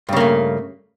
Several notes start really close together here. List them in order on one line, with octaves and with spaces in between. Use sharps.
G2 C#3 A#3 A3